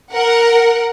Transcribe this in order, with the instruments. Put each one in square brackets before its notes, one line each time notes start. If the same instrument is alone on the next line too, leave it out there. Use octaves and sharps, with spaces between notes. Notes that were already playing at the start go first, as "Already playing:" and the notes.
[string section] A#4 F#5